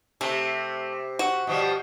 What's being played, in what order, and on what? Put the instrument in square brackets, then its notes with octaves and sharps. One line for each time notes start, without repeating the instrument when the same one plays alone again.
[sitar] C3 [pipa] A3
[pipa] F#4
[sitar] B2 F3 G3